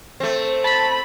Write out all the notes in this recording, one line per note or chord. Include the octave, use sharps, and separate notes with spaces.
A3 C4
A5 B5 B6